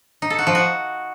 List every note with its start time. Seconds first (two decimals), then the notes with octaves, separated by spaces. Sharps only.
0.22 D#4
0.30 A4
0.39 F#4
0.47 F3
0.55 F#4